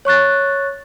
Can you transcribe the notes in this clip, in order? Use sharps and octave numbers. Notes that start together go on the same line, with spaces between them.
C#5 C#6 F#6 A6